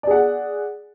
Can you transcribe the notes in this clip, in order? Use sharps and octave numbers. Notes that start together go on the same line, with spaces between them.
G#4 D5 F#5